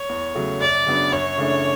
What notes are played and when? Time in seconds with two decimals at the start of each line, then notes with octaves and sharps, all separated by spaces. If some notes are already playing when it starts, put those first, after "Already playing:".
Already playing: C#5
0.09 E2
0.35 C#3 F#3 A3
0.61 F#2 D5
0.86 C#3 F#3 B3 D4
1.12 F#2 C#5
1.38 C#3 E3 A3 D4